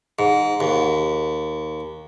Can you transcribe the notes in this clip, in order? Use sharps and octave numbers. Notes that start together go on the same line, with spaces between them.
G#2
D#2